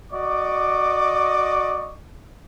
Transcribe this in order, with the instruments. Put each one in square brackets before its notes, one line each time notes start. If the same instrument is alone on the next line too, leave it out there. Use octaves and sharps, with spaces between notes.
[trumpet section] F#4 D5 D#5 C#6 D6